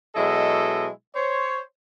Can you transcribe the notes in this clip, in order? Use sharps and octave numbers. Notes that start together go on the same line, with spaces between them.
B2 F#3 G#3 E4 A4 D#5
C5 C#5